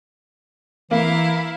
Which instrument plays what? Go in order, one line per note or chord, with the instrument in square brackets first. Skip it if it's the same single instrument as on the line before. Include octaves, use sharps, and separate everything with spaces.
[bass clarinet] E3 [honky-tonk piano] A#3 [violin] E4 F5